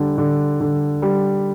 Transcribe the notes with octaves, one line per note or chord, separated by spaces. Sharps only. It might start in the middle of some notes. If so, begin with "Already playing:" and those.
Already playing: D3 G3
D3
D3
G3